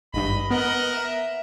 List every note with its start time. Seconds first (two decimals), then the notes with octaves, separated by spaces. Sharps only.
0.14 G#1 G2 D#5 B5
0.51 B3 A#4 D#5 F#5
0.95 E5